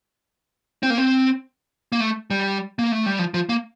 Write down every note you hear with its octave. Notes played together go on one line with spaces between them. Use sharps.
C4
A#3
C4
A#3
A3
G3
A#3
A3
G3
F3
F3
A#3